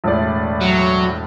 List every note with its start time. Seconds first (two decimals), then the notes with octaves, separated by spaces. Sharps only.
0.04 E1 A2 D5
0.61 F#3